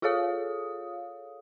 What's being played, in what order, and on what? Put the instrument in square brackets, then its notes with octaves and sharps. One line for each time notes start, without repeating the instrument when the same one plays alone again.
[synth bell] F4 G#4 A4 C#5 F5 D#6